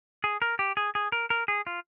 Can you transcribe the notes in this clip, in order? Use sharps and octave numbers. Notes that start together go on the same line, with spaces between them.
G#4
A#4
G4
G#4
G#4
A#4
A#4
G#4
F4